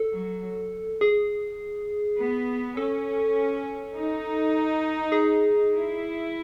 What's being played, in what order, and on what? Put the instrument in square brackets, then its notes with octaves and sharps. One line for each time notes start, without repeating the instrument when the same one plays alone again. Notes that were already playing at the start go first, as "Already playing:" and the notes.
Already playing: [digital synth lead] A4
[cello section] F#3
[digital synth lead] G#4
[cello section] B3
[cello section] C#4 [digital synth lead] A4
[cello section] D#4
[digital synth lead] G#4
[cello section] E4